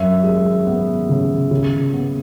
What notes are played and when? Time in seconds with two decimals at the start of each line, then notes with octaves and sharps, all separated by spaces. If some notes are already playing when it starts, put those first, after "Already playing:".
Already playing: F#2 E5
0.24 G#3
0.67 B3
1.09 C#3
1.51 C#3
1.93 B3